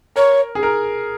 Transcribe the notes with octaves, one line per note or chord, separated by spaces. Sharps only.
A#4 C#5
G#4
A#4